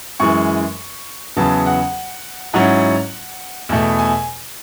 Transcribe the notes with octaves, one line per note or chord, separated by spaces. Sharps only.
F#2 E3 G#3 C#6
E2 C#3 F#3 B3 A5
F#5
G#2 F#3 C#4 E4 F#5
E2 B2 A3
G#5